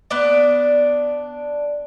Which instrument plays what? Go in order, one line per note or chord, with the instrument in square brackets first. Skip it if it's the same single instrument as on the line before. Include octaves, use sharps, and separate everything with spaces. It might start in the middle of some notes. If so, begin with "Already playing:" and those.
[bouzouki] B3 D4 D5